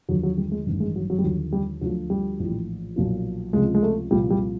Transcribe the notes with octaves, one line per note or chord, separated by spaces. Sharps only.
D#2 D3 F3 F#3
F#3
G3
G#3
A1 G2 D#3
G#3
F#3
F#3
G3
D#2 D3 F3 F#3
G3
D2 D3 F3 F#3
G3
A#1 A2 E3
B1 A#2 F3
C#2 C3 F3 G#3
G#3
A3
C2 A#2 F3 G3
G3